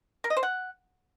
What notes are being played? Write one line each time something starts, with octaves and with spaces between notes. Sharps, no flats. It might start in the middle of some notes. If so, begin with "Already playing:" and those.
A#4
D#5
C5
F#5